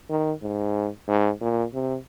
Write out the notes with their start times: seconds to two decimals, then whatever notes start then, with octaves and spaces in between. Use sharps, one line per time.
0.10 D#3
0.42 G#2
1.08 G#2
1.41 A#2
1.74 C3